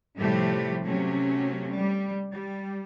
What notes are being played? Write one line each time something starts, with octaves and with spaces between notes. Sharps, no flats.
A2 C3 F3 G3 A3 G4
C3 F#3 A3 C#4
G3
G3